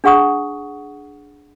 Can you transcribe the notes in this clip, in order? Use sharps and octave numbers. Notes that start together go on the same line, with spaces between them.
D4 G#4 F#5 C#6 D#6